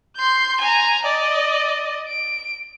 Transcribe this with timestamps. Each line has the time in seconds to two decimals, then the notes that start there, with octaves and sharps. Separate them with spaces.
0.17 C6 G6
0.60 G#5 A#5
1.05 D5 D#5
2.08 D7